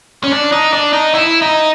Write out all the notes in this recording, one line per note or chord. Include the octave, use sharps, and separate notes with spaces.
C#4
D4
D#4
D4
D#4
E4
D#4